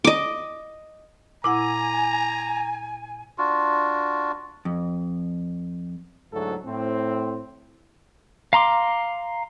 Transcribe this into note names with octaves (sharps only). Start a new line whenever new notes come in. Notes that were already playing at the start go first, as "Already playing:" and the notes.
D#5 D6
A#2 E4 F#5 G#5 A#5 D6
D4 F4 F#4
F2
D2 G#2 F#3 E4 F#4 A4
A2 C4
F5 A#5 C6 D6